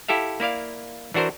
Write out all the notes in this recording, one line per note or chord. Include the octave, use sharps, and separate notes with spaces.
E4 G4 A4 E5 F5
A#3 E4 D5 F5
E3 D4 F#4 A#4 C5